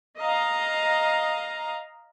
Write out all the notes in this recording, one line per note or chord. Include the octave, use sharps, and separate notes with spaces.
D#5 F5 A#5